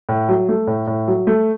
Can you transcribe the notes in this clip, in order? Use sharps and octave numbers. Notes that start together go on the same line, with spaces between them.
A2
F#3
A3
A2
A2
F#3
A3